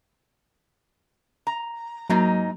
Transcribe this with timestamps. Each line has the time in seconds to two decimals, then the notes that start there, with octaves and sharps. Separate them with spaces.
1.47 A#5
2.10 G#2 F#3 A#3 D#4 A#5